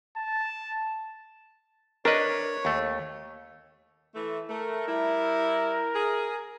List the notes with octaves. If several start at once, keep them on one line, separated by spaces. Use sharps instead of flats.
A5
D4 A#4 B4 C#5 D#5
D#2 A3
E3 A3
A3 A#4
G3 E4
G#4